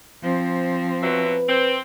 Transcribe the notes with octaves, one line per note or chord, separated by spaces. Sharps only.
F3 C4
B2 F#3 B4 E5
C4